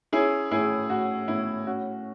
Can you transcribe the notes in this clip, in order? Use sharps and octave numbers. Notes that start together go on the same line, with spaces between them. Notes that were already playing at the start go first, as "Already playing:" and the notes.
C#4 E4 G#4
A2 E4 G#4
A2 F#4
A2 E4
C#4 F#4